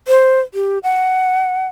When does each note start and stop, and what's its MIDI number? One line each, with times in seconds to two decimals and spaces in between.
0.08 0.40 72
0.54 0.79 67
0.83 1.67 78